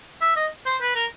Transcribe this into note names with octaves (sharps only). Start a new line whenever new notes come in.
E5
D#5
C5
B4
A#4